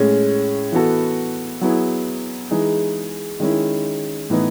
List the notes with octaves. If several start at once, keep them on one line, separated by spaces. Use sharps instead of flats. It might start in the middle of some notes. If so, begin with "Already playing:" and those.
Already playing: A2 G#3 C#4
E3 B3 F#4 A4
F#3 B3 E4 G#4
E3 G#3 D#4 G#4
D#3 G#3 C#4 E4
A2 E3 B3 D#4